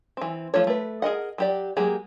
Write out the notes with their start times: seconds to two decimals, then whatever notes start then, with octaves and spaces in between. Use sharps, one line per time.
0.17 E3 C4
0.54 F3 A3 F4 C#5
0.67 A3 B4
1.02 G#4 A#4 D#5 F#5
1.38 F#3 G4 D5
1.77 F#3 G#3 A#3 G4 G#4